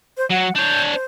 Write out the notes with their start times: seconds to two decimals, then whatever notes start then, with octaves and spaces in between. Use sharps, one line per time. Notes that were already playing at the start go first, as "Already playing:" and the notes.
0.18 C5
0.30 F#3 F#5
0.56 D4 C#5 G6
0.93 C5